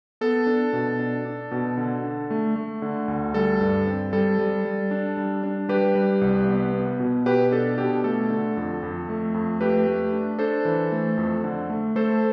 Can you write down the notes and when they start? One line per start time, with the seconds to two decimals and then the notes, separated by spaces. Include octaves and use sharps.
0.21 B3 A4
0.47 D4
0.73 B2
0.99 D4
1.26 D4
1.51 B2
1.77 D3
2.04 D4
2.30 A3
2.56 A3
2.82 D3
3.08 D2
3.34 G3 A4
3.61 G2
3.86 C4
4.13 G3 A4
4.39 G3
4.65 G3
4.91 D4
5.17 G3
5.43 D4
5.69 G3 G4 B4
5.95 G3
6.21 C2
6.47 B3
6.73 B3
7.00 B2
7.26 B2 G4 B4
7.52 D4 A4
7.78 B2 G4
8.04 A3 A4
8.30 D3
8.57 F2
8.83 F2
9.09 A3
9.34 F2
9.60 A3 G4 B4
9.87 A3
10.12 D4
10.39 D4 A4 C5
10.65 E3
10.92 A3
11.18 F2
11.44 D3
11.70 A3
11.96 A3 A4 C5